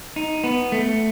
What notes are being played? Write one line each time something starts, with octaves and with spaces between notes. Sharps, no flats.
D#4
B3
A3